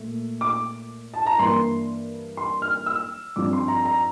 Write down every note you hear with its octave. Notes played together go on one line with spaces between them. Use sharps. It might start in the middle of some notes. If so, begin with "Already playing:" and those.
Already playing: A#2 A3
D6
A5
A#5
G2 E3 A#3 C6
C6
F6
E6
G2 F3 C4 D6
C6
A#5
A#5